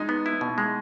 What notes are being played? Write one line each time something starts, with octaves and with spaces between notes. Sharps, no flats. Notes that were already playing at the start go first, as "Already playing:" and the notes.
Already playing: G#3 D#4
B3
E4
B2
G#3